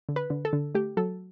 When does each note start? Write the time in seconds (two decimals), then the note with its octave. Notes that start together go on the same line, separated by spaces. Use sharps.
0.09 D3
0.16 B4
0.30 D3
0.45 A4
0.53 D3
0.75 A3 G4
0.97 F#3 A4